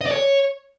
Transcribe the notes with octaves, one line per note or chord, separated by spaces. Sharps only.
D#5
D5
C#5